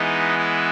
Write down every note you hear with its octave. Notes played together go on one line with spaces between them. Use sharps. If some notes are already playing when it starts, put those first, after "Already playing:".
Already playing: E3 G#3 B3 D#4
E4